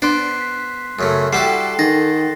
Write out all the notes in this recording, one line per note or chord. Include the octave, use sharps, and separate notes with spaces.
B3 D4 C5 C6 F#6 C7
B6
F#2 C#3 A3
G3 E4 F#4 A4 F#5 G5 C7
D#3 G#4 A6 A#6